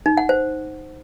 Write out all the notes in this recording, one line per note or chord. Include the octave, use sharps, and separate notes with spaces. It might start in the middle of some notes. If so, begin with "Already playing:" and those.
D#4
F#5
C5